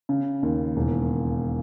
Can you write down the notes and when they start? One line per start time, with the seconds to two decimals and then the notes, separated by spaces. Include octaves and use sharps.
0.09 C#3
0.43 D#2
0.76 E1